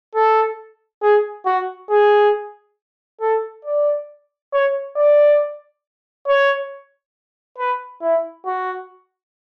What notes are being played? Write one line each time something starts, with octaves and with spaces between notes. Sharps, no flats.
A4
G#4
F#4
G#4
A4
D5
C#5
D5
C#5
B4
E4
F#4